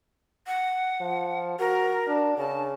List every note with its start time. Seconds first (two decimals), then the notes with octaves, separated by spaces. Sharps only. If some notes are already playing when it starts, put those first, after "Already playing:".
0.47 F#5
1.01 F3
1.59 F#4 A#4
2.07 D4
2.38 C#3 A5